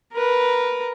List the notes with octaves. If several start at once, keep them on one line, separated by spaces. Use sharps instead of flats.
A#4 B4